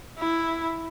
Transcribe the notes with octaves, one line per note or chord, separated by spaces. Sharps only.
E4